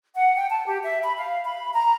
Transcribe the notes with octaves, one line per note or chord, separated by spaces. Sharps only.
F#5
G5
A5
G4
E5
B5
F5
B5
A#5